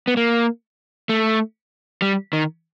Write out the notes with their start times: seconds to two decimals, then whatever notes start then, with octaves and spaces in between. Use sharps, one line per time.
0.08 B3
0.17 A#3
1.09 A3
2.02 G3
2.33 D#3